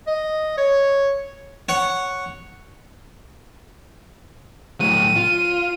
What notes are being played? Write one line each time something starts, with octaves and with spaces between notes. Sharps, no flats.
D#5
C#5
C#5 F#5
A2 F#3 D#7
F4